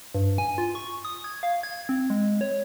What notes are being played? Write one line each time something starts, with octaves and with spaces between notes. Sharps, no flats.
G2
G#5
F4
C#6
D#6
G#6
F5
G#6
C4
G#3
C#5